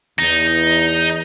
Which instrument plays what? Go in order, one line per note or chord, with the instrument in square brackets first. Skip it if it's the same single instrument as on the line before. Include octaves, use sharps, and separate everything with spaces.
[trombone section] E2 [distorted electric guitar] D#4